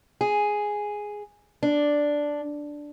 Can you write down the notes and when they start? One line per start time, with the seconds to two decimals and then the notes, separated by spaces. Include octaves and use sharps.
0.21 G#4
1.63 D4